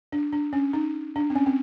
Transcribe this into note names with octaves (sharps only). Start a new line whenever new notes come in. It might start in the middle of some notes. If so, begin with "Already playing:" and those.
D4
D4
C#4
D#4
D4
C4
C#4
C4